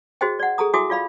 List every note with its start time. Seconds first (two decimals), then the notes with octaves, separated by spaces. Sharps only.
0.21 F#4 G#4 C5 D#5 G5
0.39 D5 F#5
0.58 G#4 A4 A#5 D#6
0.74 E4 F#4 E5 G#5 D6 D#6
0.90 F4 D5 F5 B5